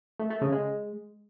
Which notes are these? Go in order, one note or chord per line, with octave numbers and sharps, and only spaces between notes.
A3
A3
C#3
G#3